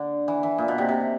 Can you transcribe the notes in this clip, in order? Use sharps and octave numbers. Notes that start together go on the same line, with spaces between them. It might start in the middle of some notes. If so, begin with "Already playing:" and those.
Already playing: D3
E3
E3
A#2
B2
C3
C3